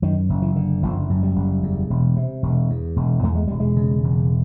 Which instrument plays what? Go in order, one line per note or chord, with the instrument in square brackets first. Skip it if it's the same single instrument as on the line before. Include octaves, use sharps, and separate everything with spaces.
[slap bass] F#2 D#3
F#1
E3
D3
F#1 F3
F#2
G3
F#1
E2
E1
C3
E1
E2
E1
E2 A3
G#3
E1 G3
G#3
C#3
E1